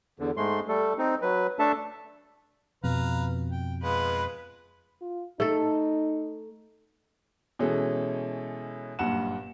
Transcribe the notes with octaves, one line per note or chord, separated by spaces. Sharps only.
E2 D3
G#2 G#3 A3 C6
G3 A3 A4
C4 D#4
F#3 B4
A3 D4 A4 E5 A5
F2 B2 B4 F5 A#5
G5
G#3 B3 F4 B4
F4
A3 D#4 A4
B2 E3 G#3 C#4 A4
F#1 G2 A#2 F#5 E7